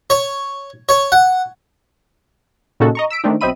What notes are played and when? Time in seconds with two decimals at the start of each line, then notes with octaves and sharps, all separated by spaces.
0.10 C#5
0.89 C#5
1.12 F#5
2.80 A#2 C#3 C#4 D#4 F#4 A4
2.95 D#5 A#5 C#6
3.10 E6 B6 D7
3.24 D#3 A3 C4 D4 D#4
3.41 B1 C4 D#5 E5 B5 D#7